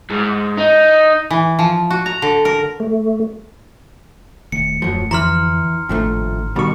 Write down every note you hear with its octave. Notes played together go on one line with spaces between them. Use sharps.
G#2
D#4
E3
F3
F#4
A#5
D3
A#4
A3
D#1 D#3 A3 C#7
D#1 F#2 F3 F#3 A3
F2 D3 E3 F3 A#5 C6 F6
G#1 D#2 A2 F3 A3 D4
B2 D#3 G3 C#6